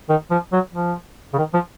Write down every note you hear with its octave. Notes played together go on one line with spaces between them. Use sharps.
D#3
F3
F#3
F3
C#3
D#3
F3